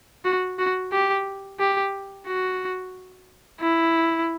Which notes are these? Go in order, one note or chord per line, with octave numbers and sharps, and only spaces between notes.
F#4
F#4
G4
G4
F#4
E4